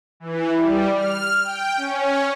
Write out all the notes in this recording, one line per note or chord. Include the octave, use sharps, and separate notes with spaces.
E3
G3
F6
G5
C#4